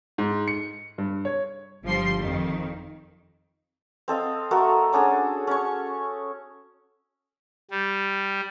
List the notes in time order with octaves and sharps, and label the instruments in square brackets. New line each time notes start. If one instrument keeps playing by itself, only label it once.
[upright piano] G#2
C#7
G2
C#5
[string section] G1 F3 G3 C6 C7
F2 D#3
[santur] C4 A4 D#5 F5
A3 F#4 A4 A#4
C#4 D4 G#4 A4
C#4 C#6
[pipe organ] G3